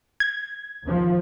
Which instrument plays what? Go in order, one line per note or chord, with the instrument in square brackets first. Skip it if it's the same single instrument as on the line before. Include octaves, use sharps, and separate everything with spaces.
[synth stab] G#6
[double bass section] D#2 F3